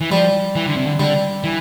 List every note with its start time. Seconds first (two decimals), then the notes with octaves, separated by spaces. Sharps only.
0.01 E3
0.11 F3 G3
0.55 E3
0.66 D3
0.76 C3
0.87 D3
0.99 D3 G3
1.44 E3